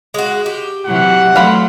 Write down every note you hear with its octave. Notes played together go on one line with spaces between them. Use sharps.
G#3 F#4
G4
C3 E3 F#3 F#5
F#3 A3 F5 B5 C6